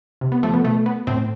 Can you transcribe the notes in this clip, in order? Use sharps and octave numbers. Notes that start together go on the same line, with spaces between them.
C3
B3
F3 A3
B3
B2 A3
B3
A2 C4